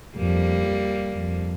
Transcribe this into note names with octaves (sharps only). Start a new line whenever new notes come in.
F2 G3 A#3
F2